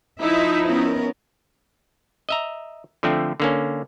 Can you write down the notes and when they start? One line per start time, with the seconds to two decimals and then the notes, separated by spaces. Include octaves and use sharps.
0.21 F3 D#4 E4 E5
0.67 B3 C#4 A#4
2.29 D#5 E5 A#5
3.03 D3 F3 A3 C4
3.40 D3 A#3 C#4